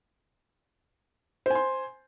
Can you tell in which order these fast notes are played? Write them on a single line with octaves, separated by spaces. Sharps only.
C5 G#5 C6